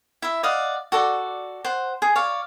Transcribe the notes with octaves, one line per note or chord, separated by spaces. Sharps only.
E4 E5
D5 D#5 F5 F#5
F#4 A4 D5
C5 F#5
G#4
C#5 D5 F5